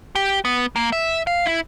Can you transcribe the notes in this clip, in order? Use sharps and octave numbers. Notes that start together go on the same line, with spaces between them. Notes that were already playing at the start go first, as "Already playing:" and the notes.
G4
B3
A#3
E5
F5
E4